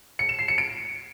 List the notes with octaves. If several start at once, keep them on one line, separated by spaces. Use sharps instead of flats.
C#7
E7
C7
C#7
D7